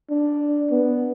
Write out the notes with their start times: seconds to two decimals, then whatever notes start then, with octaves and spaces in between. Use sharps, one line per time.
0.10 D4
0.71 B3